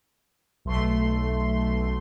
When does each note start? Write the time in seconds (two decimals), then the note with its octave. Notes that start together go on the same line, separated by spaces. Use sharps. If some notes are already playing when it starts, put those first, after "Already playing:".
0.65 B1 A3 C6